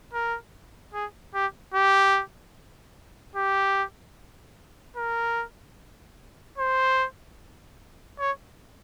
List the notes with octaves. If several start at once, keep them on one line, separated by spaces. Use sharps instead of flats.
A#4
G#4
G4
G4
G4
A#4
C5
C#5